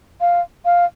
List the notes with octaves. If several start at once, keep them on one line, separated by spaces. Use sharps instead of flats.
F5
F5